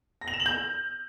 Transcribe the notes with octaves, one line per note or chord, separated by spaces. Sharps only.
A#6
F7
E7
F#7
G6